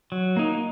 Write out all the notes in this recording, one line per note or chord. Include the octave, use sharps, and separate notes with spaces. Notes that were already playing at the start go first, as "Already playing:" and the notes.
F#3
A#3 D#4